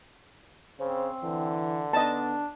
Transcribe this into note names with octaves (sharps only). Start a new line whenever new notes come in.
C#3 C4 C5
D3 E3
B3 D4 D#5 A5